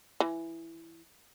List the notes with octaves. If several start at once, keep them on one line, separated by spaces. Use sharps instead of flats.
E3